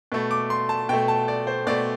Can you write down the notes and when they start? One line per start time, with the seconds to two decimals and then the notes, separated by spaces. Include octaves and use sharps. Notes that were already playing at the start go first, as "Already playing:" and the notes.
0.12 B2 A3
0.31 D6
0.50 C6
0.69 A5
0.89 B2 A3 G5
1.08 A5
1.28 D5
1.47 C5
1.67 B2 A3 D5